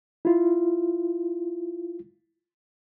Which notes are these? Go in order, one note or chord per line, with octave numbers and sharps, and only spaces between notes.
E4 F4